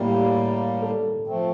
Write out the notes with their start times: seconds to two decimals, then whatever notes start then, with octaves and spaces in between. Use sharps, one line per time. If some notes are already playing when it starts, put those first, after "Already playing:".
Already playing: A2 G3 A#3 G4
0.82 A4
1.27 F3 A3 C4